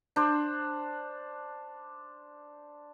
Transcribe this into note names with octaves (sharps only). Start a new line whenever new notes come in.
D4 C5